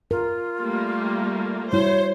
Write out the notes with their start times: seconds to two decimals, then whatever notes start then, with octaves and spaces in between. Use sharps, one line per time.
0.11 F4 A#4
0.61 G3 A3 A#3
1.73 G3 E4 F#4 C5 C#5